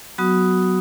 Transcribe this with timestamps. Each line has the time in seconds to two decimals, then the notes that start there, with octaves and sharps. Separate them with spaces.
0.18 F#3 B3 F#4 D#6